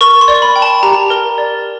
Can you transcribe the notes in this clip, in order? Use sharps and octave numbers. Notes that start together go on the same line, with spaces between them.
A#4 C#6
C6
D5
B5
G5
A5
G4 A#5
A#4
D5